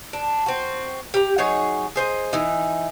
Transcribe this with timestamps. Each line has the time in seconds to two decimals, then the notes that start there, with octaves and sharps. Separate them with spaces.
0.13 D4
0.46 C4 F#4
1.14 G4 A#5
1.38 F#3 D#4 G#4 C#5
1.96 G#4 C5 D#5
2.33 E3 D#4